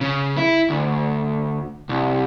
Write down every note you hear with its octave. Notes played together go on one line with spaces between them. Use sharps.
C#3
E4
D2
C2